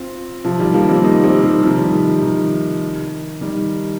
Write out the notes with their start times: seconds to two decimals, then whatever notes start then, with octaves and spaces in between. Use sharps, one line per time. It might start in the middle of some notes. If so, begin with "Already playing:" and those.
Already playing: C4 F4
0.44 C3 F3
0.59 D#3 G3
0.74 F3 A#3
0.89 G3 C4
1.04 A#3 D#4
1.23 G3 C4
1.43 D#3 G3
1.63 C3 F3
1.78 D#3 G3
1.93 D#3
2.08 C3
2.23 D#3
3.41 D#3 G3